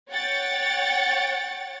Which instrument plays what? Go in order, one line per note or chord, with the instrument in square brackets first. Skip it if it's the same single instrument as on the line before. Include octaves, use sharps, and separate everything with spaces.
[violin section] C#5 F#5 G5 A6